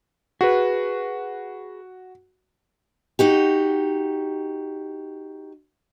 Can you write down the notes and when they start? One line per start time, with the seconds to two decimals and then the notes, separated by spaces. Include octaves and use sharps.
0.41 F#4 G#4 B4
3.19 D#4 F#4 G4